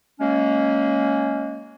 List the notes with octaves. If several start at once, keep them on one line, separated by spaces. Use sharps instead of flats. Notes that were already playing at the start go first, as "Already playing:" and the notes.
F#3 G#3 A#3 C#4